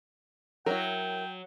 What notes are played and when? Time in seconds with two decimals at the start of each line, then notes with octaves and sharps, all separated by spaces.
0.66 F#3 E4 A#4 G5